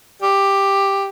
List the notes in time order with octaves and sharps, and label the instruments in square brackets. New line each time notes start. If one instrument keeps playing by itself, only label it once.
[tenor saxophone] G4